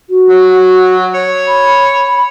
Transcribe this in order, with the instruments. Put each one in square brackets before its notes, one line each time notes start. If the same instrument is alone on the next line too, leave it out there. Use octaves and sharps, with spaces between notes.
[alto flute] F#4
[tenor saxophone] F#3
C#5
[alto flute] B5